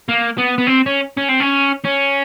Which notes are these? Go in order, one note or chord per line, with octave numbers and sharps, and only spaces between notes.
A#3
B3
B3
C4
C#4
C#4
C4
C#4
C#4